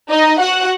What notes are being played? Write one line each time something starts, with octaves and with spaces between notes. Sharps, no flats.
D#4 D#5
F#4 F#5